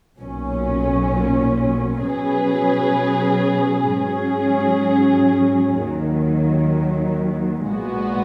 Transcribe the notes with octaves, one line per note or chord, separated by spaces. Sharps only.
B1 A#2 F#3 C#4
B2 F#3 C#4 G#4 B4
G#2 F#3 C#4 G#4
D#2 D#3 F#3
B1 A#2 G#3 B3 F#4